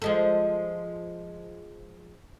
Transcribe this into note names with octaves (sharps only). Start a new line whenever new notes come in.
F3 G#3 A4